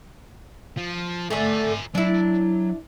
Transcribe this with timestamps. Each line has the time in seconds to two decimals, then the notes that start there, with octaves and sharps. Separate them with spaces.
0.77 F3
1.30 D3 A3 A#4 G#5
1.95 F#3 D4 E4